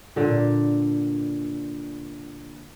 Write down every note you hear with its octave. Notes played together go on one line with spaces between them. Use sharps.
A#2 D3